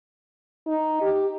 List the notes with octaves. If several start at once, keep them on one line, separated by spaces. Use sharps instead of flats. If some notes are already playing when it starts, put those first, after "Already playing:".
D#4
G4